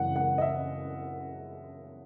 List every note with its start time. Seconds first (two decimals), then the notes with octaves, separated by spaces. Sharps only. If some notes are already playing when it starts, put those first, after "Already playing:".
Already playing: F#2 C#3 E3 G#3 F#5
0.16 F#5
0.38 D#5
0.41 E5